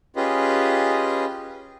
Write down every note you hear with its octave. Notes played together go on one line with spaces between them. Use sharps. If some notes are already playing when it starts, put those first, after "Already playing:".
C#4 F4 G4 G#4 B4 D#5